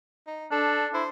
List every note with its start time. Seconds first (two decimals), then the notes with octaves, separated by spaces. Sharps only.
0.27 D#4
0.51 D4 A4
0.94 E4 C5